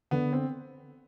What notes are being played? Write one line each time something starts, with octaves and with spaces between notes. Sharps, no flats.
D3 B3
C4